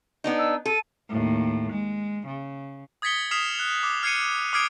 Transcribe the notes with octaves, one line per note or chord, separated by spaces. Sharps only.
B3 D4 D#4
E6
A4 D#7
D#2 A2
G#3
C#3
D#6 G#6 A6 B6 C#7 G7
D#6 F6 B6 C7 E7 F7
F#6 F7
D6
F6 G#6 C7 C#7 D#7
D6 D#6 F6 G#6 C7 D7